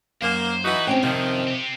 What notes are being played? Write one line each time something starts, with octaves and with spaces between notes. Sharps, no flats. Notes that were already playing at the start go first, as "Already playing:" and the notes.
F#2 A#3 C5
E3 D#4 F#4 B4
C#3 C4 C#4 G4 G5
F#2 C3 D#3 F3 F#3
C4 G4